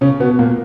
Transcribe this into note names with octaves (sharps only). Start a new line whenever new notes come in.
C#3 C#4
B2 B3
A#2 A#3